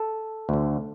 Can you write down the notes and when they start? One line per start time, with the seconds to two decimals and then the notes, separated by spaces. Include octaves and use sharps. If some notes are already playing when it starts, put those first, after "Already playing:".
Already playing: A4
0.49 D2 D3